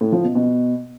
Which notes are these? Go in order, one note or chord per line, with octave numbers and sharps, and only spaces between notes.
A2
F3
B2
B2